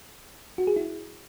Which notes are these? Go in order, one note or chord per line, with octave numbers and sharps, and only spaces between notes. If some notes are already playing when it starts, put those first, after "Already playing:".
F#4
G#4
E4